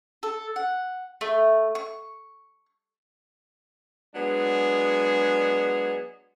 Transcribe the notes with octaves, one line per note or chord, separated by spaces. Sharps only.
A4
F#5
A3
C#6
F#3 G#3 B3 D4 G#4